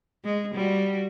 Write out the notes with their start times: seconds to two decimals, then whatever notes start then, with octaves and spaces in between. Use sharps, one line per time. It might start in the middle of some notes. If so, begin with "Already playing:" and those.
0.24 G#3
0.54 G3 F#4